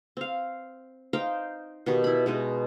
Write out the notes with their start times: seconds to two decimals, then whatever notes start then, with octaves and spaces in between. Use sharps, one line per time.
0.17 C4 F5
1.13 D#4 C5 F5 G5
1.86 B2 D#3 G4
2.04 E4 B5
2.26 B2 G#3 D#4